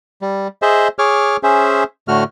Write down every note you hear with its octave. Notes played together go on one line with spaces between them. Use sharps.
G3
G#4 C5 D#5 E5
G#4 C#5 D6 F6
C#4 G#4 C5 E5
A2 D3 A3 F#4 F6